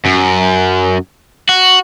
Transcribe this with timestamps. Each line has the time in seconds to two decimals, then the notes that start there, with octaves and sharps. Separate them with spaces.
0.05 F#2
1.49 F#4